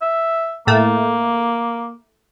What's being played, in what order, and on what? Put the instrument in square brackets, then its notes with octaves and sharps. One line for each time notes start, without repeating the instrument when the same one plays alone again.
[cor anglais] E5
[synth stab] A2 A3 [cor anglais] A#3